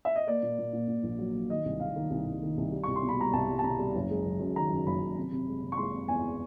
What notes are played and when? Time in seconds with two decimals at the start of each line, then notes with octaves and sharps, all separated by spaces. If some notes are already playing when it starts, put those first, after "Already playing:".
0.05 E5
0.16 D#5
0.27 A#3 D5
0.43 A#2
0.58 A#2
0.73 A#2
0.88 A#2
1.03 A#1
1.19 F#3
1.34 F#3
1.50 D#3 D#5
1.65 C2
1.80 C2 F5
1.96 D#3
2.11 C2
2.26 C2
2.42 D#3
2.57 C2
2.72 G3
2.83 C2 C#6
2.96 C6
3.03 B2
3.09 B5
3.18 G3 A#5
3.33 C2 A5
3.49 G3
3.59 A5
3.63 B2 A#5
3.79 G3
3.95 F#1
4.10 G#3
4.25 F#1
4.40 F#2
4.56 D#3 A#5
4.70 F#2
4.86 F#1 B5
5.02 F#1
5.17 C3
5.32 C3
5.48 G#3
5.63 C3
5.72 C#6
5.77 G#3 C6
5.93 C3
6.08 E2 G#5